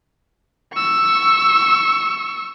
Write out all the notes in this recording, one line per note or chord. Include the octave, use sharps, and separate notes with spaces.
C#6 E6